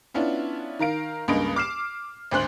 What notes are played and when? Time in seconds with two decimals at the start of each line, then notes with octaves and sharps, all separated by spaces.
0.14 B3 C#4 D4 E4 F4
0.79 D#3 A#4 F5 D7
1.28 C#2 G2 A#3 D#5 D7
1.56 D6 F6 C7 E7
2.31 G#1 D2 C5 F#6 F#7